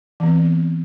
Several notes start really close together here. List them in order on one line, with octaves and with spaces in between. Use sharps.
E3 B3 C4